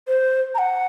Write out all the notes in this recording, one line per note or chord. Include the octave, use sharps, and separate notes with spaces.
C5
A#5
F#5